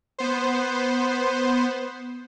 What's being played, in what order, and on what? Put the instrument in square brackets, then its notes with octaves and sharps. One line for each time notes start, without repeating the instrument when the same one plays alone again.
[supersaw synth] B3 C5